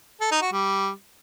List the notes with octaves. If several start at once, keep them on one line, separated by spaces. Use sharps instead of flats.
A4
D#4
F#4
G3